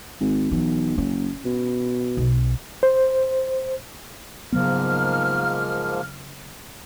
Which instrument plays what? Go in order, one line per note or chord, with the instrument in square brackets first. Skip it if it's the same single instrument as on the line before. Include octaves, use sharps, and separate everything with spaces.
[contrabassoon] G#1
[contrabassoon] B1 [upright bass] E3
[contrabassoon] F#1 [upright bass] C#4
[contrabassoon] B2
[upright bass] B1
[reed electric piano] C5
[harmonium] G#2 F3 A#3 [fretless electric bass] C#3 F#3 B3 [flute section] F6